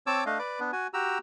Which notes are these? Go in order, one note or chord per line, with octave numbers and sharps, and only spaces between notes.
C4 C#5 A5 D6 E6
A3 D4 D#5 F5
B4 D5 D6
B3 D4
F#4 G#5
F#4 G4 A#5 E6